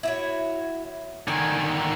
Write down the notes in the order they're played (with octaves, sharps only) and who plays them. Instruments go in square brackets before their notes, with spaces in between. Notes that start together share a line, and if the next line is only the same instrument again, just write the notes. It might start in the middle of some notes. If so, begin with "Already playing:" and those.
[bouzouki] E4 F#4 C#5
[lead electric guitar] D3 D#3 [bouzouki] G#5